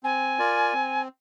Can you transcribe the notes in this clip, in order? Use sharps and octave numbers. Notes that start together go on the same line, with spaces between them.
C4 G#5
F4 A#4 D5
C4